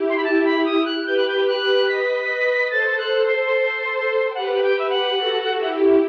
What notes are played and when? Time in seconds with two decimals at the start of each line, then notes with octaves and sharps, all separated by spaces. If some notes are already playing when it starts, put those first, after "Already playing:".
Already playing: E4 G4
0.10 C6
0.17 B5
0.24 A5
0.45 B5
0.65 D#6
0.85 F#6
1.06 G4 B4 G6
1.17 F#6
1.28 G6
1.47 F#6
1.88 B4 D#5 B6
2.70 A4 C5 A6
2.98 F#6
3.25 C6
4.30 G5
4.35 G4 B4 F#5
4.63 G5
4.76 G4 B4 E5
4.90 F#5
5.17 F#4 A4
5.58 E4 G4